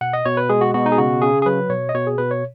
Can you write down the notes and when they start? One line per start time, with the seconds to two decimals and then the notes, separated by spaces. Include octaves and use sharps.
0.01 B2 F#5
0.13 D#5
0.25 B2 C#5
0.37 B4
0.49 G#3 G#4
0.61 F#4
0.74 B2 F#4
0.86 D#4
0.92 G#4
0.98 C#3 F#4
1.22 C#3 G#4
1.42 G#4
1.46 F#3 B4
1.70 B2 C#5
1.89 D#5
1.95 B2 C#5
2.07 G#4
2.18 B2 B4
2.31 C#5